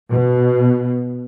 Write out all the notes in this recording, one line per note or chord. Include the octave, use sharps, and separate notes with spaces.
B2